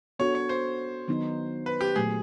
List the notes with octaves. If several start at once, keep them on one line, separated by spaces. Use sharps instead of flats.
B3 D4 F#4 A4 C#5
C#5
C5
D#3 F#3 B3 D#4
B4
G4
A#2 F#3 A3 G#4